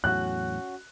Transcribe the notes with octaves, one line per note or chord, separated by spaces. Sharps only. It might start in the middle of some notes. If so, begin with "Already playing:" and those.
E2 A2 F#3 C#4 F#4 F#6